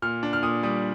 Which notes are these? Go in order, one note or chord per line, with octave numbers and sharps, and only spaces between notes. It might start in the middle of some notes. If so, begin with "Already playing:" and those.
A#2 F6
D4
F6
A#2 D#6
G3 D#6